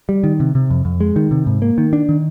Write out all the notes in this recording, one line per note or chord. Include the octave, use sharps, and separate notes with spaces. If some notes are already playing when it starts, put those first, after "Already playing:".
G3
D#3
C3
C3
F2
F2
G#3
D#3
C3
G#2
A#3
D#3
D4
D#3